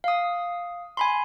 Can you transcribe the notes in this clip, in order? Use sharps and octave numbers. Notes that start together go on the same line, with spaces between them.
F5 D#6
G#5 B5 C6